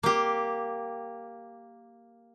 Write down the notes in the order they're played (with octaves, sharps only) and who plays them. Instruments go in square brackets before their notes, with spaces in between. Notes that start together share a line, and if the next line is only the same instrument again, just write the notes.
[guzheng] A#3 G4